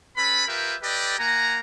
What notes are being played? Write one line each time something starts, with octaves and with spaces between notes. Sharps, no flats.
C#4 A4 B4 B5
F4 G4 A#4 B4 E5 G5
G4 A4 B4 D5 D#5 G5
A#3 F#5 G#5 A#5